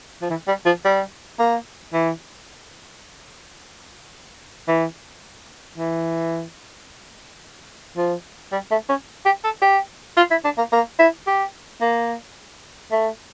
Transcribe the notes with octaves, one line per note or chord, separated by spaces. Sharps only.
F3
E3
G3
F3
G3
A#3
E3
E3
E3
F3
G3
A3
C#4
G4
A4
G4
F4
E4
D4
A#3
A#3
E4
G4
A#3
A3